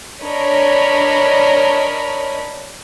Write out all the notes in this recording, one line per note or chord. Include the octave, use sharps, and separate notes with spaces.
D4 A#4 C#5 D#5 B5